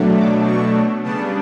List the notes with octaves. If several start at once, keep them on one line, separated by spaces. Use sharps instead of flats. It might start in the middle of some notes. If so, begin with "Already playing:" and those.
Already playing: B2 F#3 A3 D4
D6
C#6
C#3 G3 B3 D4 A5